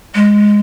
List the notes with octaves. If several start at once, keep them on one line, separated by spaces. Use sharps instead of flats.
G#3